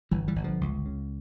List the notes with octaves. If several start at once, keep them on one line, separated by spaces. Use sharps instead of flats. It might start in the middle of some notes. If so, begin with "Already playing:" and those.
G1 E3 G3
E3 G3
G1
D3 F3
C#2
C#3